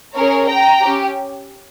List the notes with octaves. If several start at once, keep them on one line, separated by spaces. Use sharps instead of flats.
C#4 G#4 A#4 C#5
G5 A#5
C#4 G4